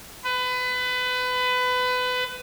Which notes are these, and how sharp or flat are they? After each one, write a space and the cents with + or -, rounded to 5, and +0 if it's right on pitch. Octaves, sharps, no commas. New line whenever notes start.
B4 +25